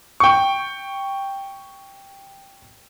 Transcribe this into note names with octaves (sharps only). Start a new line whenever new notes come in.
G5 C#6